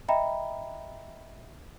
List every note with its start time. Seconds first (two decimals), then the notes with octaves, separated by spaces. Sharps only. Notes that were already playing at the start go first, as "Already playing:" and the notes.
0.08 D#5 E5 G5 A#5 B5